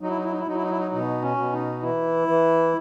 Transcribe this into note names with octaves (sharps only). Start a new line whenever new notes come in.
F#3 D#4
E4
D#4
E4
D#4
E4
F#3 D#4
E4
D#4
E4
D#4
B2 D#4
C#4
B2
D#4
E3 E4
E3